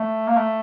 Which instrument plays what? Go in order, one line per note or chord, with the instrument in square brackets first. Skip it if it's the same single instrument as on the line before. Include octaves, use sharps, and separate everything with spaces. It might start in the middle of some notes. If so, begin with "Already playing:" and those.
Already playing: [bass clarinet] A3
A#3
A3